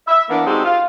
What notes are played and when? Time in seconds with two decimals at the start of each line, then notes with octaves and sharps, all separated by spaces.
0.08 E5
0.30 E3 A#3 B3 D4
0.47 G#3 C4 D#4 F#4 G4 A4
0.65 F4